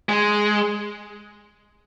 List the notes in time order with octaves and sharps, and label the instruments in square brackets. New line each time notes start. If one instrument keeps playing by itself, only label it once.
[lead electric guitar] G#3